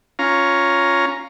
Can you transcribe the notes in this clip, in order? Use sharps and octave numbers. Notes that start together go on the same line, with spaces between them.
C#4 F4 A#5